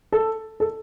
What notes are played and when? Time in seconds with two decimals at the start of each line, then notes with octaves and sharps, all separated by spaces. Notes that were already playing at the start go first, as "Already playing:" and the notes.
0.12 A4
0.60 A4